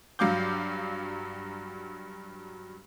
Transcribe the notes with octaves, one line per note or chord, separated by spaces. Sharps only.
G2 F#3 F5 D6 G6